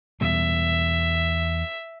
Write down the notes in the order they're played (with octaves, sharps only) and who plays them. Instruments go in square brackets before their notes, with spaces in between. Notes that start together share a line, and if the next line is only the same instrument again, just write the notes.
[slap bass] E2 B2 G3 [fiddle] E5